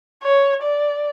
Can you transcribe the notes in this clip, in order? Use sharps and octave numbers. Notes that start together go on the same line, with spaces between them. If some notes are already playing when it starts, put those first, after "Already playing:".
C#5
D5